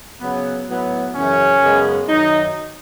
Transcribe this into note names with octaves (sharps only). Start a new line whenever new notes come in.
C#3 F#3 B3
A2 F#3 B3
F#2 C#3 E3 C#4
F#2 C#3 G#3 B3
F#2 D#3 F#3 D#4